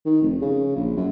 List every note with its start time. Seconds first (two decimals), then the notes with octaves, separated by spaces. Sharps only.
0.05 D#3
0.22 F1
0.42 C#3
0.76 A#1
0.97 F#2